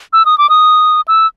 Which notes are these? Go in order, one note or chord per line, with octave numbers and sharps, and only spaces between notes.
E6
D#6
D6
D#6
E6